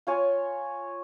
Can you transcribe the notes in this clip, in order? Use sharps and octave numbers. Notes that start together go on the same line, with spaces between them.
F4 C#5 G#5